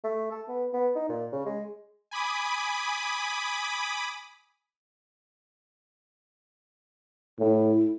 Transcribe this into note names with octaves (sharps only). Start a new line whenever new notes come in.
A3
A4
B3
B3
D#4
A#2
C#3
G#3
G#5 B5 D6 D#6
A2 E4